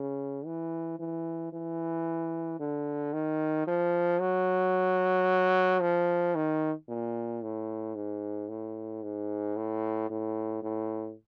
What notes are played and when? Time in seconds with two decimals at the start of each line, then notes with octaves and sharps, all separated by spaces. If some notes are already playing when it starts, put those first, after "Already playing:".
Already playing: C#3
0.46 E3
0.99 E3
1.53 E3
2.60 D3
3.13 D#3
3.67 F3
4.20 F#3
5.81 F3
6.35 D#3
6.89 A#2
7.42 A2
7.95 G#2
8.48 A2
9.03 G#2
9.57 A2
10.10 A2
10.62 A2